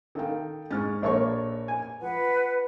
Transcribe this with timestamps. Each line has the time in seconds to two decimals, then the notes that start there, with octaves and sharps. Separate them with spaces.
0.15 D#3 A4 F5 G5
0.71 G#2 C#6 F6 A6
1.02 A#1 A4 A#4 C#5 D5 C#6
1.68 G#5
2.01 F3 B4 F#5